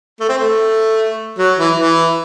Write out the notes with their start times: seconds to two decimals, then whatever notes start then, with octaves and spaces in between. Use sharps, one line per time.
0.20 A3
0.29 C4
0.38 A3
1.38 F#3
1.58 E3
1.77 E3